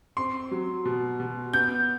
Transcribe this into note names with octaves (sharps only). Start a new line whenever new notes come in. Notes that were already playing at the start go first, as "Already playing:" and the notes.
C4 C6
F#3
B2
B2
B3 G6